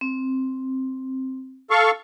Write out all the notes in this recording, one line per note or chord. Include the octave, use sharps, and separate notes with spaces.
C4
A4 F5 C#6